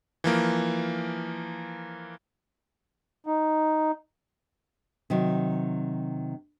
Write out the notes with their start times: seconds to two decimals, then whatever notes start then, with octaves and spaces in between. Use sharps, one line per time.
0.24 E3 F3 A#3
3.27 D#4
5.10 C3 D#3 F#3